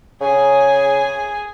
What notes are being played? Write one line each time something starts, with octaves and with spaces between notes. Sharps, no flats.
C#3 G#4 G#5